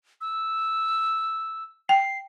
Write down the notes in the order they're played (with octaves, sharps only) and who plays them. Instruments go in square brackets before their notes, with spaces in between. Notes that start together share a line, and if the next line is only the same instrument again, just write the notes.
[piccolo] E6
[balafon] G5 [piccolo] C7